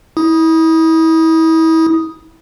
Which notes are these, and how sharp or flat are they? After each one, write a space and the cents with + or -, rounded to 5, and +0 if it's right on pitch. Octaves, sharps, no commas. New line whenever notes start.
E4 -30 D#6 +0